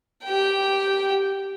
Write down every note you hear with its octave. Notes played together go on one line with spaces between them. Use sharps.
G4 G5